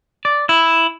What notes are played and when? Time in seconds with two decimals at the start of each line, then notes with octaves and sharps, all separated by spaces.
0.25 D5
0.49 E4